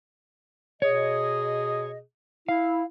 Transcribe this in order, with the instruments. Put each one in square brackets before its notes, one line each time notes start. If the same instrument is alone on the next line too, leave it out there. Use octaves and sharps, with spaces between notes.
[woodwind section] B2 G#4 D#5 [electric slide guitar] C#5
[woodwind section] E4 [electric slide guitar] F5